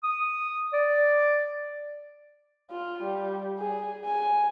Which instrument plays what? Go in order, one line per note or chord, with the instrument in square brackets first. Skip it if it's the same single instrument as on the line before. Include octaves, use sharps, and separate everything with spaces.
[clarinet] D#6
D5
[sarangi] F4
G3
G#4
G#5